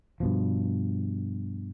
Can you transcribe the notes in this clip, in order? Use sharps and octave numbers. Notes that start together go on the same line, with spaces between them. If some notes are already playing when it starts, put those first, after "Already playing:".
G2 B2 F3